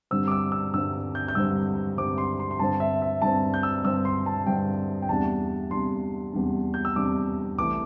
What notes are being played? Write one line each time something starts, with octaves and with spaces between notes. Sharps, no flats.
G2 D3 G3 C4 E6
D6
E6
E6
G2 D3 G3 C4 E6
G6
G6
G2 D3 G3 C4 E6
G2 D3 G3 C4 D6
C6
C6
C6
G2 D3 C4 A5
E5
E5
G2 D3 C4 A5
G6
E6
G2 D3 C4 E6
C6
A5
G2 D3 C4 G5
G5
E2 C3 G3 D4 A5
E2 C3 G3 D4 C6
E2 C3 G3 D4
G6
E6
E2 C3 G3 D4 D6
C2 C3 E3 A3 D6